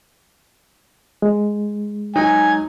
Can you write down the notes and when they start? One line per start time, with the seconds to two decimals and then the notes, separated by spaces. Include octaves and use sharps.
1.22 G#3
2.16 F#3 D#4 G#5